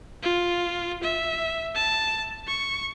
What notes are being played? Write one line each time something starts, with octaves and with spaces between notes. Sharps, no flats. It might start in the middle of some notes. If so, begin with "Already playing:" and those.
F4
E5
A5
C#6